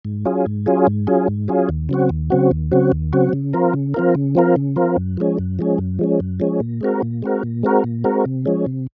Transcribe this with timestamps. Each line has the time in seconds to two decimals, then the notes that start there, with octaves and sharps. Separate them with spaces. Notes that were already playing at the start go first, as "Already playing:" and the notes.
0.05 G#2
0.25 F#3 C#4 F4 G#4
0.46 G#2
0.66 F#3 C#4 F4 G#4
0.87 G#2
1.07 F#3 C#4 F4 G#4
1.28 G#2
1.48 F#3 C#4 F4 G#4
1.69 D#2
1.89 C#3 F#3 C4 F#4
2.09 D#2
2.30 C#3 F#3 C4 F#4
2.51 D#2
2.71 C#3 F#3 C4 F#4
2.92 D#2
3.13 C#3 F#3 C4 F#4
3.33 C#3
3.53 F3 C4 F4 A#4
3.74 C#3
3.94 F3 C4 F4 A#4
4.15 C#3
4.35 F3 C4 F4 A#4
4.56 C#3
4.76 F3 C4 F4 A#4
4.96 F#2
5.17 F3 G#3 C#4
5.39 F#2
5.59 F3 G#3 C#4
5.78 F#2
5.99 F3 G#3 C#4
6.20 F#2
6.40 F3 G#3 C#4
6.60 A#2
6.81 G#3 C4 F#4 A#4
7.02 A#2
7.22 G#3 C4 F#4 A#4
7.43 A#2
7.63 G#3 C4 F#4 A#4
7.84 A#2
8.04 G#3 C4 F#4 A#4
8.25 C3
8.46 F3 G#3 C#4
8.66 C3